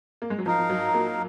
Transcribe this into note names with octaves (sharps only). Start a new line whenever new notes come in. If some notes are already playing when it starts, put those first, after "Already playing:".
A#3
G#3
F#3
F3 D#4 A#4 F5
F3
F#3
A#3